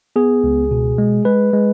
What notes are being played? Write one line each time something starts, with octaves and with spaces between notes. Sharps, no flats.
B3 G#4
C#2
B2
G#3
G#3 B4
G#3